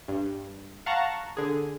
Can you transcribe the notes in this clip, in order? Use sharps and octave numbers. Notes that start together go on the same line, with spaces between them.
G2
F5 F#5 A5 A#5 C#6
D3 G#4